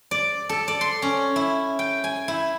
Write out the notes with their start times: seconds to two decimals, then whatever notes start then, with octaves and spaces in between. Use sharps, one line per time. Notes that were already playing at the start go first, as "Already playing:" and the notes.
0.11 D5
0.49 A4
0.68 D5
0.81 C6
1.02 C#4
1.36 E4
1.79 G5
2.04 G#5
2.28 E4